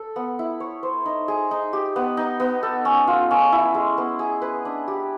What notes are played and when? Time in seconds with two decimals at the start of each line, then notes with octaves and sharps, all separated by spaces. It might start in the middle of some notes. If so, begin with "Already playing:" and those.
Already playing: A4
0.16 B3
0.39 E4
0.60 C#5
0.83 C5
1.06 D#4
1.28 G#4
1.51 D#4
1.73 G4
1.96 B3
2.17 D#4
2.40 B3
2.63 A4
2.85 C#4
3.07 F4
3.31 C#4
3.52 E4
3.74 G#3
3.98 B3
4.19 G#4
4.42 B4
4.65 D4
4.88 G4